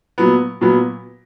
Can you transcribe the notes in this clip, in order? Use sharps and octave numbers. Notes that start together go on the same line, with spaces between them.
A#2 F#3 B3
A#2 F#3 B3